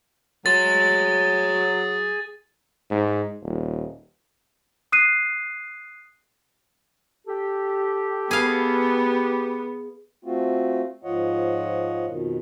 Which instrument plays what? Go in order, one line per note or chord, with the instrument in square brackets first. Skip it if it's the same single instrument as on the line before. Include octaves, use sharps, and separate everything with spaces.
[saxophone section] F#3 [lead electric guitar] G#4 C6 [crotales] A6
[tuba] G#2
D#1
[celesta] D#6 F#6 C7 D#7
[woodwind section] G4 [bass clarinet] A4
[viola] B3 [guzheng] G#4 F5
[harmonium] A3 C4 F4 F#4
G#2 F3 F4 C#5 D#5 F#5
F2 B2 D#3